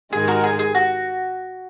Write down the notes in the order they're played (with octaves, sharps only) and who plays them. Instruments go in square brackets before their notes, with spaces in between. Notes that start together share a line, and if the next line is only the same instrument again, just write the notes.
[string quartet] G#2 D#3 G#3 D#4 [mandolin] G#4
[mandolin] F#4 A#4
G#4
G#4
F#4